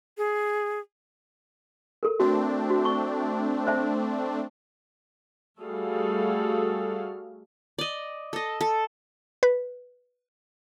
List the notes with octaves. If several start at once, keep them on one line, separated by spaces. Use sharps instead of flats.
G#4
A4 A#4
A3 C4 D4 F#4
F#4
C#6
C5 E5 A5
G3 A3 F#4 G#4 A4 F5
D5 D#5
A4 D#5
A4
B4